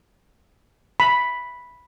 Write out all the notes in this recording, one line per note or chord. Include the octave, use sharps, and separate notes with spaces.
B5